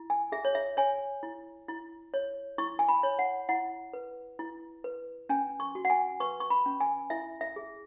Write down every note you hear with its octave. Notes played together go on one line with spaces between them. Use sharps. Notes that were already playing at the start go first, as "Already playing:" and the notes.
Already playing: E4
G#5
G#4 E5
C#5
E5
C#5 G#5
E4
E4
C#5
E4 C#6
G#5
B5
C#5
F#5
E4 F#5
B4
E4
B4
C#4 G#5
C#6
F#4
F#5
G#5
B4 C#6
C#6
B5
C#4
G#5
E4 E5
E5
G#4